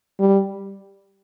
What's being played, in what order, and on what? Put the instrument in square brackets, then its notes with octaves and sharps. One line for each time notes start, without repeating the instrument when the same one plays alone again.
[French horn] G3